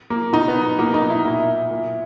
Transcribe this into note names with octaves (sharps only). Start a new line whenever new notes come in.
A#3
B2 D#4
B3
B2 A#3
D#4
E4
A#2 E4
A#2